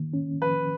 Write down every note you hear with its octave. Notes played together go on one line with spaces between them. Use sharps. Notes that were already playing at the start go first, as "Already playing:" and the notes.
Already playing: D#3 A#3
C#4
F3 B4